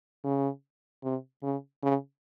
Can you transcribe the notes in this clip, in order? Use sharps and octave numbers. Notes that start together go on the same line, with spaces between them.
C#3
C3
C#3
C#3